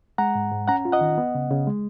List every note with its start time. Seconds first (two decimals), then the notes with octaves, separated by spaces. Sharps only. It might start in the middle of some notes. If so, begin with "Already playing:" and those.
0.18 G#3 F#5 A#5
0.35 G#2
0.52 G#2
0.68 C#4 F#5 A#5
0.85 F4
0.92 D#5 F#5
1.01 D#3
1.18 B3
1.35 C#3
1.51 C#3
1.67 G#3